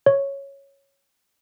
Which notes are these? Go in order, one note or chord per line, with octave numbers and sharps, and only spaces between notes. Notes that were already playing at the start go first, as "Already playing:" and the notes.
C#5